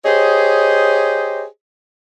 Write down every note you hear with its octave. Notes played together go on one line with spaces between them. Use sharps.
G4 G#4 C5 C#5 D#5